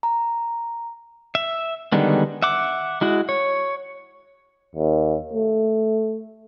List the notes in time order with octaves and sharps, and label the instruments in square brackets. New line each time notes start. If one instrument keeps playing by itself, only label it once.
[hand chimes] A#5
[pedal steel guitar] E5
D3 D#3 G3 G#3 B3
E5 F#5 D6
G#3 E4 F#4
C#5
[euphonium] D#2
A3